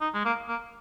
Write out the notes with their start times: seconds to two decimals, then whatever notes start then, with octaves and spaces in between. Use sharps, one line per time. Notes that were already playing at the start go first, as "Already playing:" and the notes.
0.01 D#4
0.14 G#3
0.25 A#3
0.48 A#3